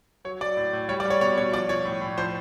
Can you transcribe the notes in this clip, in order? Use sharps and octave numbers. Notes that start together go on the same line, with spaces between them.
F#3 C#5
F#3 D5
A2
A2
G3 C#5
D5
G3 C#5
B2 C#5
B2 C#5
F3 D5
F3 C#5
A2
A2
F3 C5